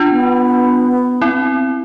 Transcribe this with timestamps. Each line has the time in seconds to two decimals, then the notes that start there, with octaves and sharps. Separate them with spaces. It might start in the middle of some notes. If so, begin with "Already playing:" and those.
Already playing: D4 F4
0.09 B3
1.22 C4 E4